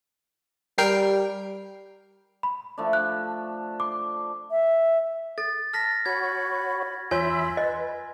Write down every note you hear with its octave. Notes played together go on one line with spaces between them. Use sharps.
G3 A#4 G5 C7
B5
F3 A3 D4
F#6
C6 D6
E5
A4 A6
A5 F6 A#6 B6
F#4 C#5 B5 G#6
E2 F4 C#5 E5 G#5 B5 C6
B4 D#5